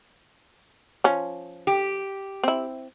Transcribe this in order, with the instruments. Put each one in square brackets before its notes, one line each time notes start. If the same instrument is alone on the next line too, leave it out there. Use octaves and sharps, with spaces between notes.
[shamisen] F3 C#4
[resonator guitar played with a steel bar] G4
[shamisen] C4 E4